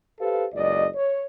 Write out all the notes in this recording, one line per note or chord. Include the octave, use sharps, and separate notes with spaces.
G4 A4 B4 C5 F5
F#1 C#2 D5 D#5
C#5